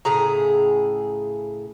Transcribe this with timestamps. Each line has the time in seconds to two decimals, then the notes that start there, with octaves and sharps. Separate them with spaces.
0.05 A2 C#3 G#4 A#5